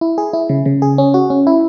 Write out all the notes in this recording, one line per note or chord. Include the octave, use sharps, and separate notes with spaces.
E4
G#4
E4
C#3
C#3
G#4
C#4
F#4
C#4
E4